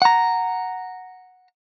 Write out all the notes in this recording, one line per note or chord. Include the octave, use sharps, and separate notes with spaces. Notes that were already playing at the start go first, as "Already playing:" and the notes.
F#5 A#5